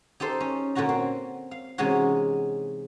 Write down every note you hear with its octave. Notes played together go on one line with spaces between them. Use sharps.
D#4 G4 A4 C5
C#4
A#2 D3 C#4 F#4 A#5
C4
F5
C3 E3 G#3 C#4 D#4 F#4